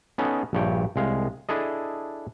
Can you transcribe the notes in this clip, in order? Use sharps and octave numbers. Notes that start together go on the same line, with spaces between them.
B3 C#4 D#4 A4
A#1 G2 C#5 G5
C2 G#3 F5
D4 E4 G#4 A4 D#5